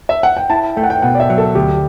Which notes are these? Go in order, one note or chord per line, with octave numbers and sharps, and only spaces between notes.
E5
F#5
G5
E4 A5
A3 G5
F#5
G5
B2 F#5
D5
E5
F#3
A4
D2 G4